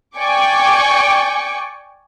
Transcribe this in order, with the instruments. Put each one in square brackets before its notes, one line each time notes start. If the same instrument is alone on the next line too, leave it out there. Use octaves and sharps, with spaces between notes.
[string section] D5 G5 G#5 C#6 D6